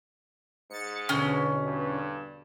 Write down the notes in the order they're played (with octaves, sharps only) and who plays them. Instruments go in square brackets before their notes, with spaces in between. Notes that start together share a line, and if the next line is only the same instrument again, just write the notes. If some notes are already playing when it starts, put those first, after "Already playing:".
[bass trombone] G#2 [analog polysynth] A6 C#7
[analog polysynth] E2 B2 D3 [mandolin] C#4
[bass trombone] G2